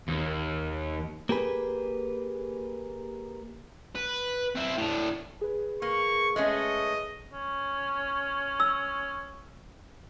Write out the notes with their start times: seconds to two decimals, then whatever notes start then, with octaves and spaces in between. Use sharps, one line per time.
0.08 D#2
1.29 A#3 G4 G#4 B4
3.95 B4
4.56 C4 E4
4.78 A2 D4
5.41 G#4 B4
5.82 A#3 C#6
6.36 G#3 A3 C#4 D#5
7.33 C#4
8.60 E6